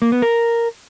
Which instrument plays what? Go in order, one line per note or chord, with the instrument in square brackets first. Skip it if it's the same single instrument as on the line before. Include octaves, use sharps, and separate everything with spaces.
[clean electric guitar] A#3
B3
A#4